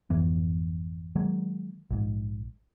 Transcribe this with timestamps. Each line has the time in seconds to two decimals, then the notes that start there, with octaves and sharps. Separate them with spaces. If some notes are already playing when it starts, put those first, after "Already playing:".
0.10 G#1 F2 E3 B3
1.16 D#3 F#3 G#3 A#3
1.91 A#1 G#2